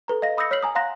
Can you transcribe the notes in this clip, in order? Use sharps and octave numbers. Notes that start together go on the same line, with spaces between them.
A4 B4 A#5
D#5 F5 A#6
B5 D#6 E6 G6 A#6 C#7
C#5 F6 B6 C7 F#7
G#5 A#5 D#6
F5 F#5 A#5 C6 F#6 A#6